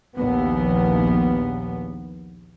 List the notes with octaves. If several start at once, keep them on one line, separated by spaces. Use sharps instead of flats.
A#1 D#2 B3